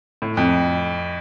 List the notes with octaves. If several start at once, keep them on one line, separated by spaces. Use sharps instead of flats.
A2
F2